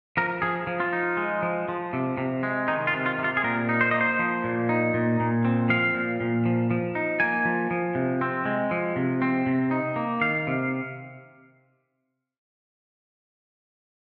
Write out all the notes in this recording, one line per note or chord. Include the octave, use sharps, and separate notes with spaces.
F3 A#4
F3 G#4
F3
F4
D#4
G#3
F3
F3
C3
C3
G#3
D#3 D#4
F4
C3
F4
C3
F4
G#4
A#2 A#4
D#4
C5
A#3 D#5
C5
F3
A#2
D#4
A#2
A#2
C4
F3 F5
A#2
A#2
F3
F3
D#4
A#3 G#5
F3
F3
C3
C4
G#3
F3
C3
C4
C3
D#4
A#3
D#3 F5
C3